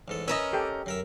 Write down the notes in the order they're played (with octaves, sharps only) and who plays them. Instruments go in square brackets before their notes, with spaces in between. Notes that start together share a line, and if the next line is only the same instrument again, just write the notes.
[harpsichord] A1 G#2 A4
[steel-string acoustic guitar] C#4 A#4 D#5 [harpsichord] B4 E5 [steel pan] E6
[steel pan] G4 A4 G5
[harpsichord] F#2 A#4 E5